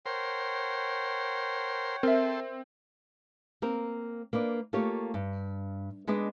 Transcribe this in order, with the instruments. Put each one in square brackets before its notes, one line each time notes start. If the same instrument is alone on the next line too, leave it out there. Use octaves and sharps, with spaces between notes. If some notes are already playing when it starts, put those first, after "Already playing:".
[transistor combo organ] A#4 C5 C6 [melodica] C#5 F#5 G5
[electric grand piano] C4 [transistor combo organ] A4 C5 [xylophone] A#4 E5
[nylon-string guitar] A#3 C4 A#4
A#3 D4 B4 D5
A3 A#3 F4 G4 C#5
G2
G#3 B3 D4 G#4 D5 D#5